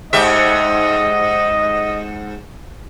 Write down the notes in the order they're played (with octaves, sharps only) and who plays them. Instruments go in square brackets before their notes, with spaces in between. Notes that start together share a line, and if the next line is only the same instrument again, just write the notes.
[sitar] G#2 G4 E5 [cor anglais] D#5